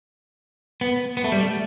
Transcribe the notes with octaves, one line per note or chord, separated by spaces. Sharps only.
B3
B3
A3
G3
A3